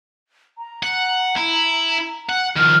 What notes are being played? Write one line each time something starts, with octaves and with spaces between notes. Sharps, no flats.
A#5
F#5
E4
F#5
D#3 F3 F6